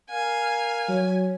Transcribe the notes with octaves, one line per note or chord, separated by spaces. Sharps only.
A#4 F5 G#5
F#3 C#5